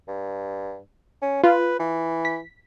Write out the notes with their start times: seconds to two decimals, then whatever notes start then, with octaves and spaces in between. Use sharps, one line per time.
0.08 G2
1.22 C#4
1.44 F4 B4
1.79 E3
2.25 B6